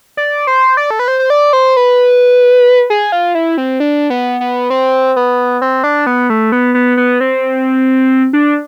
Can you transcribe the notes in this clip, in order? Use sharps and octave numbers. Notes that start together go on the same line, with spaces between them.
D5
C5
D5
A4
B4
C5
C5
D5
C5
B4
G#4
F4
E4
C4
D4
B3
B3
C4
B3
C4
D4
B3
A3
B3
B3
B3
C4
D4